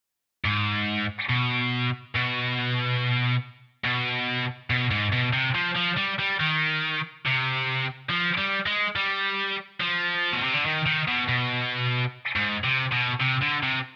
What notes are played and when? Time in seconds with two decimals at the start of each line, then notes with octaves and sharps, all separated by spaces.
0.45 G#2
1.29 B2
2.15 B2
3.85 B2
4.70 B2
4.91 G#2
5.13 B2
5.33 C3
5.55 F3
5.76 F3
5.97 G3
6.19 G3
6.40 D#3
7.26 C3
8.10 F3
8.38 G3
8.66 G#3
8.96 G3
9.80 F3
10.33 B2
10.43 C3
10.54 D3
10.66 D#3
10.86 D#3
11.08 B2
11.29 B2
12.36 G#2
12.64 C3
12.92 B2
13.21 C3
13.42 D3
13.63 C3